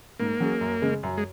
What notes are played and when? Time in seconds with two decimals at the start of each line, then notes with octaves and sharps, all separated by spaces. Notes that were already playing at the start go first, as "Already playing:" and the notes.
0.19 G#2 A#3
0.40 F#3 C#4 G#4
0.61 F#2
0.82 C#3 G#3
1.03 F#2
1.17 G#3